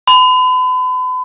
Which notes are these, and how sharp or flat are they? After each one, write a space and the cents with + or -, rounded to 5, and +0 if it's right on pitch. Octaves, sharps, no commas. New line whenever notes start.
B5 +40